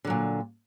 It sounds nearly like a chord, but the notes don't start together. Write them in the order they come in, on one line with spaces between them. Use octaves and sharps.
D3 F#3 A#2